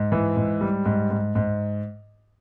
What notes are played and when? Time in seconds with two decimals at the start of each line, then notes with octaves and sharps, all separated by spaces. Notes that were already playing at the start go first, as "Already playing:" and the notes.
Already playing: G#2
0.12 E3
0.36 G#2
0.61 G3
0.85 G#2
1.11 G#2
1.35 G#2